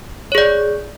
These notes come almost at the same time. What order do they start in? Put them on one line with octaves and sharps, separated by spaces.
C#5 G#4 D5